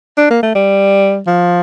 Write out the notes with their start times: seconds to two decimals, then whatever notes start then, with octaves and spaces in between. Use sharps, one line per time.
0.17 D4
0.30 A#3
0.43 A3
0.55 G3
1.27 F3